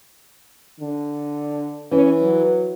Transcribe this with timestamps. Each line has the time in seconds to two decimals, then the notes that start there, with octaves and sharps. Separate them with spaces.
0.80 D3
1.91 E3 C#4
2.22 F#3